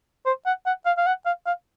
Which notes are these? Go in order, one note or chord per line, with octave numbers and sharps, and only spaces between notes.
C5
F#5
F#5
F5
F5
F#5
F5
F5